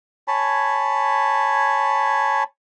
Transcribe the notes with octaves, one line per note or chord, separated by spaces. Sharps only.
C#5 G#5 A5 B5